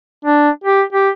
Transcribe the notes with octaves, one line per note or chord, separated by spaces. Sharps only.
D4
G4
G4